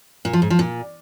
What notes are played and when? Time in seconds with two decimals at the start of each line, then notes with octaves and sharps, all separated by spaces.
0.25 A#2
0.33 F3
0.42 G#2
0.50 F3
0.59 A#2